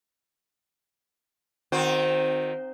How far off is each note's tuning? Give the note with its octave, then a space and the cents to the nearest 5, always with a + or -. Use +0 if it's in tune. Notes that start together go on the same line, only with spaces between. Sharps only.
D#3 -10 C4 +0 F#4 -40